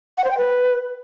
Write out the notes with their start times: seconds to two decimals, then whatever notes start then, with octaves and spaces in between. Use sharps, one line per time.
0.18 F#5
0.24 C5
0.31 G5
0.37 B4